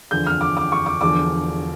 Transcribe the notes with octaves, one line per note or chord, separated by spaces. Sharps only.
E2 D3 F3 G6
F6
D6
D6
C#6
D6
E1 E2 D3 F3 D6